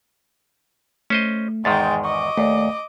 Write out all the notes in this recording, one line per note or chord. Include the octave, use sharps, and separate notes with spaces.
A3 C#4 C5 D#5
E2 G#2 D#3 G#3 G5 A6
D#5 C#6 D6
D#2 A3 D5